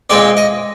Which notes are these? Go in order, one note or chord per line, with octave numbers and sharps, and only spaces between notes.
A#2 G#3 C4 D5
D#5